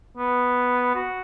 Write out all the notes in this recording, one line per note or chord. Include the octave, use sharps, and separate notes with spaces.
B3
F#4